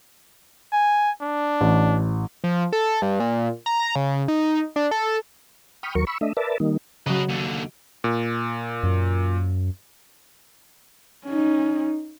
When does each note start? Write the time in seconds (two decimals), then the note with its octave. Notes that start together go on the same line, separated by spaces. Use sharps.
0.73 G#5
1.22 D4
1.61 A1
2.44 F3
2.73 A4
3.02 G2
3.20 A#2
3.66 A#5
3.96 C#3
4.28 D#4
4.76 D4
4.91 A4
5.83 G5 B5 C#6 D#6 F6
5.95 D#2 F#3 A#4 C#6
6.07 B5 C#6 E6
6.21 A3 D4 D#5 E5
6.37 A#4 B4 D5 E5 A5
6.60 D#3 G3 A#3 D#4
7.06 C#3 F#3 B4 D#5
7.29 D#2 D3
8.04 A#2
8.83 F#2
11.26 C#4 D#4